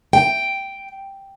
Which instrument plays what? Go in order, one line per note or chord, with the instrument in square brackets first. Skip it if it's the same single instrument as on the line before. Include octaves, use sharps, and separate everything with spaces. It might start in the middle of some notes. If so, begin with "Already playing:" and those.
[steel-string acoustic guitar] G5